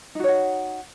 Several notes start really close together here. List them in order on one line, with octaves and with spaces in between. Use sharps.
D#4 F#4 C#5 F#5